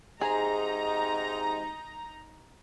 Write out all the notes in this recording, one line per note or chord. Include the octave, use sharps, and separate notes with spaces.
G#2 C3 G#3 D#4 G#4 A#5